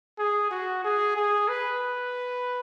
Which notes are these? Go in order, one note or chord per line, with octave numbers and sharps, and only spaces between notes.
G#4
F#4
G#4
G#4
B4